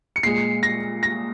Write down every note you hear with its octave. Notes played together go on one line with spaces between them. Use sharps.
C#7
A#2 G#3 C7
A#6
A#6